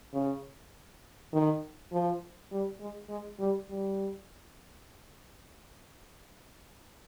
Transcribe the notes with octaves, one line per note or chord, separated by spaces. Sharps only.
C#3
D#3
F3
G3
G#3
G#3
G3
G3